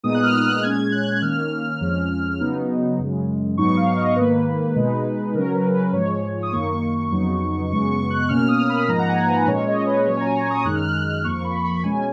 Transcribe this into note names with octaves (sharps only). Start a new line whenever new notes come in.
A#2 G#3 B3 D#4 D#6
F#6
F6
F#6
A#2 G#3 C#4 G#6
F#6
D#3 A#3 C#4 F6
F2 F3 G#3 C#4
C#3 F#3 B3 D#4
F#2 C#3 G#3
G#2 F#3 B3 D#4 C#6
F5
D#5
G#2 D#3 A#3 B4
B2 G#3 D#4
C#3 F#3 C#4 A#4
B4
B4
G#2 F3 G#3 C#5
D#6
F#2 D#3 A#3 C#6
F2 C#3 F#3 B3 D#4
F#2 C#3 G#3 B3 C#6
C#6
F#6
B2 A#3 C#4 F6
D#6
B5
G#2 F3 A#3 D#4 A#5
F#5
G#5
B4
A#2 G#3 C#4 C#5
D#5
B4
A#2 F#3 C#4 C#5
G#5
A#5
C#6
D#6
F#2 D#3 G#3 D#4 F#6
F6
F#6
F2 F3 A#3 C#6
B5
B5
B2 G#3 C#4 G#5